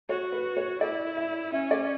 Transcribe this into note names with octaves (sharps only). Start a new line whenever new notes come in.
F#4 C#5
B4
C#5
E4 D5
E5
C#4 E5
D5